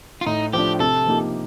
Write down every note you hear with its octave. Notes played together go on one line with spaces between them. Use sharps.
F4
A2 D#4
F3 A3 D4 G4
C3 A4
F3 A#3 D#4 G4